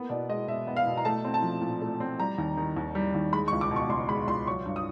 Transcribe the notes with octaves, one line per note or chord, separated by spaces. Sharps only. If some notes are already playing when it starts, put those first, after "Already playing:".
Already playing: A#3 B3
B2 D5
G#3 D#5
B2 E5
B3
F5
B2
A#5
A3 A5
C4
A5
F3
A#2
A3
C4
G3 A#5
D#2
D#3
D#2
G3
D#2
G#3 B5
C#6
C#2
D6
B2
C#6
C#2 C6
G#3 B5
C#2 C6
F#3 C#6
G2
D#6